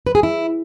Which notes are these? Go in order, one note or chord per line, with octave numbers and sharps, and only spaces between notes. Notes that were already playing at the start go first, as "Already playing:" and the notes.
B4
G#4
E4